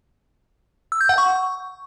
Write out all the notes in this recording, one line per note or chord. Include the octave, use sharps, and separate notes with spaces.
E6
G6
F#5
C#6